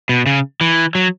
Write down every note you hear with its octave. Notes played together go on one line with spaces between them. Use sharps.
B2
C#3
E3
F#3